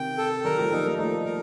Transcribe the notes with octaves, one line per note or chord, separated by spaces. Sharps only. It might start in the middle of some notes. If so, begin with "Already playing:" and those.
Already playing: C3 D#3 G5
A4
D#3 G3 A#4
F3 A3
G3 A#3 D#4
G3 A#3
F3 A3 D#4
A#4